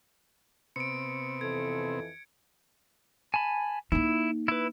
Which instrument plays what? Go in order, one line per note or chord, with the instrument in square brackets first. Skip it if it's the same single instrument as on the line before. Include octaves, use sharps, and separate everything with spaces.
[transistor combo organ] C3 B3 C4 [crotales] C#7 D7
[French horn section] F2 E3 A4 [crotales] G#6
[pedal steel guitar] G#5 A5 B5
[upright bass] A#3 D#4 [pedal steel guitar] E4
[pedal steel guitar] E4 B4